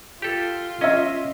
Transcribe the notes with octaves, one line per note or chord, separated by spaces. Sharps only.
F4 G4 A4
C#4 D#5 E5